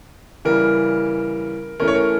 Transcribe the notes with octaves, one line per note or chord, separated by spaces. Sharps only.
C#3 E3 G3 A#4
E3 A3 C#4 A#4
C#5
A#4